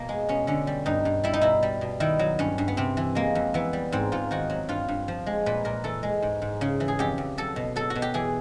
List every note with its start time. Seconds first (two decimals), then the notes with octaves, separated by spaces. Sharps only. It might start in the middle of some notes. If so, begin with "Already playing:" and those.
Already playing: B2 A#3
0.09 G#3
0.29 B2 C#4
0.47 D3 C#4
0.67 G3
0.86 G2 D#4
1.05 G2
1.24 G3 E4
1.33 D#4
1.41 B2 E4
1.63 G3
1.81 B2
2.00 D#3 E4
2.19 F#3
2.39 G2 C#4
2.58 G2
2.68 B3
2.77 C3 C4
2.97 E3
3.15 G#3 A#3
3.35 F2
3.54 E3 B3
3.73 G3
3.92 G#2 C4
4.12 G#2 F4
4.31 D#3 F#4
4.50 F#3
4.69 G2 F4
4.88 G2
5.08 F3
5.26 G#3
5.46 A#2 B4
5.65 A#2 A#4
5.84 E3 A4
6.03 G#3
6.22 G#2
6.42 G#2
6.61 C#3
6.80 E3
6.88 G#4
6.99 F2 G4
7.18 F2
7.38 F#3 A4
7.56 B2
7.76 F#3 A4
7.90 F#4
7.95 B2
8.02 G4
8.14 E3 G#4